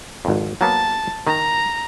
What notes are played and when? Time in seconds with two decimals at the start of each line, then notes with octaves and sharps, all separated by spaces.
0.25 G#1 F2
0.61 F#3 A#3 B3 A5
1.27 D#3 A#5